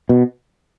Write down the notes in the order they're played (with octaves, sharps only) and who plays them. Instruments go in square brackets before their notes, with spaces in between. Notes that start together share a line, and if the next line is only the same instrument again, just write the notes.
[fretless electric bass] B2